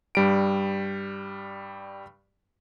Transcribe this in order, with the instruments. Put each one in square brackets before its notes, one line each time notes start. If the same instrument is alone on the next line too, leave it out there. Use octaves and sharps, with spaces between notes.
[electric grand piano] G2 G3 D7